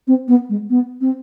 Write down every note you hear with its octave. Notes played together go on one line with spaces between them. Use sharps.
C4
B3
G#3
B3
C4